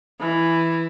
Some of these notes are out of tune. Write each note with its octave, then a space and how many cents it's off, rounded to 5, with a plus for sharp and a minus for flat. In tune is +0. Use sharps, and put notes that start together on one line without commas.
E3 +5